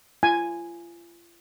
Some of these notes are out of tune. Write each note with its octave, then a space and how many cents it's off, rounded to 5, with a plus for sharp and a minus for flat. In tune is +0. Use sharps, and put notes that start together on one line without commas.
F4 -40 G#5 +0